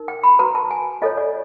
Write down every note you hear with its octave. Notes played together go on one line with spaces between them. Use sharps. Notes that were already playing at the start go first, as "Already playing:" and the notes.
Already playing: D#4 A#4
G5
B5
F#4 B4 A#5
A5
G#5
F4 A4 C#5 D#5
D5